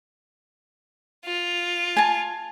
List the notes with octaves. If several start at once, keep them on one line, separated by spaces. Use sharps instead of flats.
F4
G#5 A5